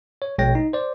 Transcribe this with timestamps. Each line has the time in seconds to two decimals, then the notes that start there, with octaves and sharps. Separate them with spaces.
0.22 C#5
0.38 A#1 B2 G#3 C#5 G5 A#6
0.55 D#4
0.73 C5 D5